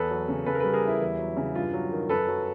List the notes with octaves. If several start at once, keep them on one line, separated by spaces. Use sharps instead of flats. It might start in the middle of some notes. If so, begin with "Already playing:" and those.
Already playing: E2 A4 B4
F#3
C#3
C#3 A4 B4
A#4
G3 A4 B4
G#4 A#4
E3 E4
E2
F#3
C#3
G2 F4
F#3
D#3
F#2 A4 B4
F#3